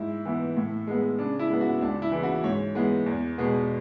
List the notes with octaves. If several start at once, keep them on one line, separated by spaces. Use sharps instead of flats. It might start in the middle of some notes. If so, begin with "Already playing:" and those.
Already playing: G#2 E4
E3 B3
A2
G#3 B3
C#3 D4
E4
G#3 B3
F#4
C#2 D4
E4
C#3 E3
F#4
G#2 C#5
E3 G#3 B3
E2
B2 G#3 B3